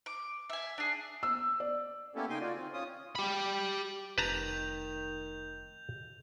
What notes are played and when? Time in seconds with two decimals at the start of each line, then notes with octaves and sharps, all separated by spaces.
0.06 D6
0.50 E5 G#5
0.78 D4 G#4
1.23 E6
1.60 D5
2.15 A#3 B3 C#4 E4 G4 A4
2.30 C#3 D#4 G5 G#5 C6 D6
2.41 F4 F#4 D5
2.56 D#3 C4
2.73 C#4 F4 D#6
3.15 G4 B5
4.18 F1 D#3 B4 A5 A#5 G6 F7